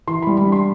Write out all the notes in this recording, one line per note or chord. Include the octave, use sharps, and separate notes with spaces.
E3 C6
G3 B5
B5
D4
C6